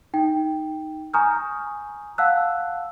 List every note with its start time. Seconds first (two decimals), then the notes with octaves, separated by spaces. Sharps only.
0.14 D#4 G5
1.13 G#5 A#5 C#6 D#6 F6 G6
2.18 F5 F#5 A5 E6 F#6